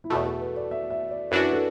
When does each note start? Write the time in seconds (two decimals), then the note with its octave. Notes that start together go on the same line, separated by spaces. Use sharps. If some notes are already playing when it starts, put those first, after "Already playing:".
0.04 E4
0.10 E2 B2 A3 F#4
0.26 A4
0.41 B4
0.56 D5
0.71 E5
0.90 E5
1.10 D5
1.31 F#2 E3 D4 F#4 B4
1.53 A4